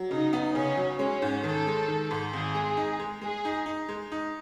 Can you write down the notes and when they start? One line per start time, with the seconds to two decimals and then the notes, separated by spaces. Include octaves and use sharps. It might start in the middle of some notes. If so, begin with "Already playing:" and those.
Already playing: F#3
0.11 C#3 D#4
0.33 B3
0.55 C#3 C#4
0.77 F#3
0.99 G#3 C#4
1.22 G#2
1.44 D#3 A4
1.67 G#3
1.88 D#3
2.11 G#2
2.33 G#1 G#4
2.55 G#3
2.77 D#4
3.00 G#3
3.21 G#3 G#4
3.45 D#4
3.66 D#4
3.89 G#3
4.12 D#4